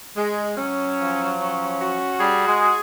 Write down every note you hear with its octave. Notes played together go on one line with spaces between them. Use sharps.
G#3
F#3 C#4
F3
C#4
F#4
G3 G#4
G#3
G#4